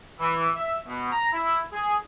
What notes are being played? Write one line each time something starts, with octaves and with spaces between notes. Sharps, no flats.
E3
E5
B2
A#5
E4
G#4